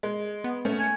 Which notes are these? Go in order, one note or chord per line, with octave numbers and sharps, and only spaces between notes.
G#3
B3
A3 C#4
G#5